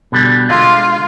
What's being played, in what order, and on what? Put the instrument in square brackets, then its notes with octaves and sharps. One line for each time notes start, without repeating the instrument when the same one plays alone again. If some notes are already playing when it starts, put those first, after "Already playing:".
[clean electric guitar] B2 D3 G3
[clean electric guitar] D3 G#3 [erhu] F4